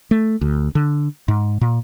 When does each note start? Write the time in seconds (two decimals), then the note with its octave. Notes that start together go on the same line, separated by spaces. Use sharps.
0.11 A3
0.41 D2
0.75 D3
1.28 G#2
1.61 A#2